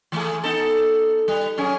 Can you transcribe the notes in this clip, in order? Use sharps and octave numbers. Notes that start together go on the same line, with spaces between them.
E3 A3 G#4
B3 D#4 A4
G3
F#3 C#4 G#4